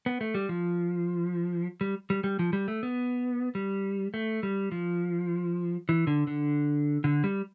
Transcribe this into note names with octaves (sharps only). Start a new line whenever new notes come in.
B3
A3
G3
F3
G3
G3
G3
F3
G3
A3
B3
G3
A3
G3
F3
E3
D3
D3
D3
G3